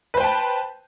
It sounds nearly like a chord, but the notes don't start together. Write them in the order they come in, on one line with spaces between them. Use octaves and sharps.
B4 C5 G5 A5